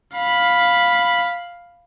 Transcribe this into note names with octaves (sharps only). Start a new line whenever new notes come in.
F5 B5